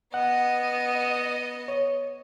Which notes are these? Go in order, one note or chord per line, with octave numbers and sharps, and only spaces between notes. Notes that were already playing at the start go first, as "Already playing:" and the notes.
B3 D#5 F#5
C#5